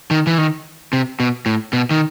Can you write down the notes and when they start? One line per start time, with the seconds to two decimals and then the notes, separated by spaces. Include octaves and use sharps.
0.11 D#3
0.27 E3
0.38 D#3
0.93 C3
1.20 B2
1.46 A2
1.73 B2
1.91 D#3